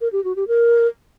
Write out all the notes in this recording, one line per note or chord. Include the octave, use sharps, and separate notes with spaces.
A#4
G4
F#4
G4
A#4